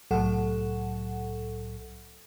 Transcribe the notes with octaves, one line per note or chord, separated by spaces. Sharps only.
C2 A2 F#3 A4 F#5